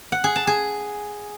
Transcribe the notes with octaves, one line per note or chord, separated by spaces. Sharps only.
F#5
G#4
A5
G#4